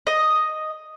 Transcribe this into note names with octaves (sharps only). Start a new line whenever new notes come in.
D#5